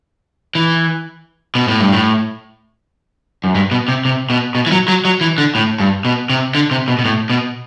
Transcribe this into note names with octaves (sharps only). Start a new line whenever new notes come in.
E3
B2
A2
G2
A2
F#2
G2
B2
C3
C3
B2
B2
E3
F#3
F#3
F#3
E3
D3
A2
G2
B2
C3
D3
C3
B2
B2
A2
B2